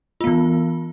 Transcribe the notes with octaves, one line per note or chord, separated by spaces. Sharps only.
E3 B3 F4